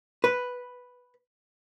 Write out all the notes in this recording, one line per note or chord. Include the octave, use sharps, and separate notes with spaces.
B4